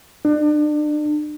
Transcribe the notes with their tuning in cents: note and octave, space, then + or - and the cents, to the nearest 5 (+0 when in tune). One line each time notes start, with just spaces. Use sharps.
D4 +35